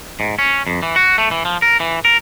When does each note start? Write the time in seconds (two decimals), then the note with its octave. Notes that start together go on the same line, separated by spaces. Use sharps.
0.20 G#2
0.39 C#4
0.67 F2
0.83 E3
0.96 F#4
1.18 A3
1.31 E3
1.45 F3
1.62 A#4
1.80 E3
2.05 A#4